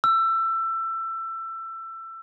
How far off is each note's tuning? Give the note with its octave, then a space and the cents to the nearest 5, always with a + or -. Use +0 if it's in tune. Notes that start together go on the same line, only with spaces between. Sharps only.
E6 +20